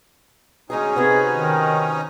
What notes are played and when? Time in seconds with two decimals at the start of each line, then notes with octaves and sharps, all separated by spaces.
0.70 D2 G#3 C#4 D#4 G#4
0.96 C3 B3 F#4 G#4
1.34 D#3